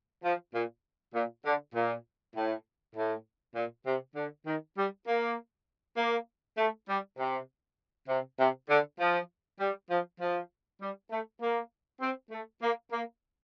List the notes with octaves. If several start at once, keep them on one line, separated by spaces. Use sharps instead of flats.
F3
A#2
A#2
D3
A#2
A2
A2
A#2
C3
D3
D#3
G3
A#3
A#3
A3
G3
C3
C3
C3
D3
F3
G3
F3
F3
G3
A3
A#3
C4
A3
A#3
A#3